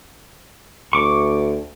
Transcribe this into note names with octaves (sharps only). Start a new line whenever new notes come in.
D2 C#6 D6